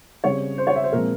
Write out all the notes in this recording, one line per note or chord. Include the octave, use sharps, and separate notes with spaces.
C#3 G3 C4 C#5
C5
C#5
E5
C5
A#2 F3 G#3 C4 A#4